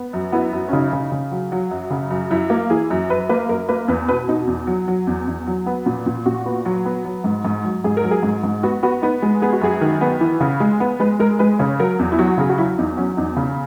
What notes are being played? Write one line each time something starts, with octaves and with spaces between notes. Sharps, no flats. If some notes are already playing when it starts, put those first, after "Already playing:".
Already playing: B3
F#2
B3 E4
F#2
C#4
C#3 D#4
C#3
C#3
F#3
F#3
F#2
C#3
F#2
F#2 E4
A#3
E3 G#4
F#2
F#2 B4
A#3 B4
F#2 A#4
A#3 B4
E2 B4
B2 B4
B2 D#4
E2
F#3
F#3
E2
E2
F#3
B3
A#2
A#2
A#2 F#4
B3
F#3
B3
F#3
G#2
G#2
F#3
G#2 G#4
A#4
F#3
G#4
G#2
G#2
B3 F#4
B3 F#4
B3 D#4
G#3
B3 G#4
F#4
F#2 G#4
D#3
B3
E3
C#3
G#3
B3
G#3 B4
G#3 A#4
G#3 B4
C#3 C#5
F#3 A#4
E2
E4
F#3 F#4
C#3 G#4
F#4
F#3 E4
E2 D#4
F#3 C#4
E2 D#4
C#3